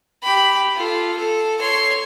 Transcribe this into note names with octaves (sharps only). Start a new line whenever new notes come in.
G4 B5
F4 A4
A4
C#5 C6